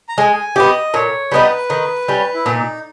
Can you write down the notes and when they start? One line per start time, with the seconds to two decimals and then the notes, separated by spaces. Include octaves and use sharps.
0.09 A#5
0.18 G#3 G#5
0.56 B3 G4 D#5
0.94 A#2 C#5
1.31 G3 B3 D#4 B4
1.70 D#3
2.08 G3 C#4
2.34 E4
2.46 A#2 D#4